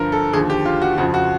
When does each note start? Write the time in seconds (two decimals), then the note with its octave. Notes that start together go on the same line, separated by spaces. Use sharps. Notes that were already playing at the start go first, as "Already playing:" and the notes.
Already playing: G2 D3 F3 A#4
0.12 A4
0.33 D#2 D3 F3 G#4
0.50 G4
0.65 F4
0.82 F#4
0.98 F2 C#3 F3 F#4
1.14 F#4